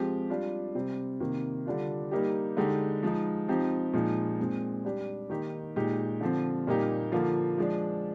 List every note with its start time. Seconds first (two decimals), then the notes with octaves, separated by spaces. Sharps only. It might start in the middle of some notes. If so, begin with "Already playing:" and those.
Already playing: F3 G#3 C4 G4
0.30 G3 D4 F4
0.75 C3 G3 C4
1.20 C3 D#3 A#3
1.66 D3 G3 D4 F4
2.11 G3 A#3 D#4 G4
2.57 D3 G#3 D#4 G4
3.03 F3 G#3 D#4
3.48 F3 C4 D#4 G4
3.93 A#2 F3 G#3 D#4
4.39 A#2 G#3 C4
4.85 G3 D4 G4
5.30 D#3 A#3 D#4 G4
5.76 A#2 G#3 D#4 G4
6.21 D3 F3 C4
6.67 A#2 G3 A#3 D#4 G4
7.12 D3 F3 A#3 F4
7.58 F3 G#3 D4